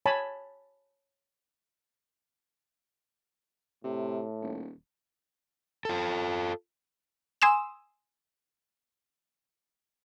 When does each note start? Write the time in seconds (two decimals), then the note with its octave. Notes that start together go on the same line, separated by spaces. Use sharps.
0.06 C#5 G#5 A5 B5
3.84 A2 C3
4.42 D#1
5.85 F4 A4
7.42 G#5 C6 D#6 E6 E7